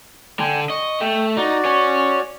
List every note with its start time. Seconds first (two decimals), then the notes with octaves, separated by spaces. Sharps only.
0.40 D3 G5 G#5
0.70 D#5 C#6
1.01 A3 G5
1.37 D#4 F#4 D5
1.65 C#5 G#5